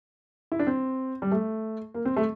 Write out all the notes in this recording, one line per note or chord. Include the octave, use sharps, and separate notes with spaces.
E4
D4
C4
G3
A3
A#3
C4
A3